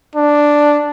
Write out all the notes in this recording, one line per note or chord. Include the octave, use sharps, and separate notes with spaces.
D4